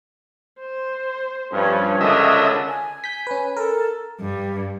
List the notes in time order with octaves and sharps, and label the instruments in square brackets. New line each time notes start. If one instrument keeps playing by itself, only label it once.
[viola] C5
[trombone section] G2 [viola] F3 C#4
[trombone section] C#2 D3 C#4 [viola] D4 A#4 [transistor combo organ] D#5 E5
[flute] G#5
[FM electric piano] G6 B6
C#4 B4
[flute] A4 [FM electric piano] A#4
[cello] G2